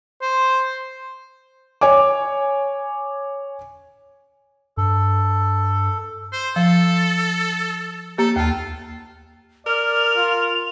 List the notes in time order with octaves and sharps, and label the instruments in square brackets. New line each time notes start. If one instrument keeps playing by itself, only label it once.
[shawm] C5
[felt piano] C#5 G#5 D6
[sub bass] G2 [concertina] A4
[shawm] C5
[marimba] F3 [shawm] A4
[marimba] A#3 G4 [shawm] A4
[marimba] D#2 A5 [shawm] F4
[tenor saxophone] A#4 [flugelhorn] D5 [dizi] F6 [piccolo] F7
[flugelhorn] F4